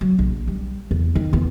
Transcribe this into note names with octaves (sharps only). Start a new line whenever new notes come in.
F#3
A#1
G3
E2
D#3
E2 B3